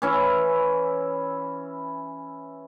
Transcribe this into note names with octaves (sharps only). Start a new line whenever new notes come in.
E3 C#4 E4